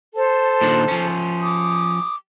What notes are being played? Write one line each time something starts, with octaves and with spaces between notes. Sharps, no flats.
A4 C5 A5
A#2 D#3 D4
F3 C#4
D6 D#6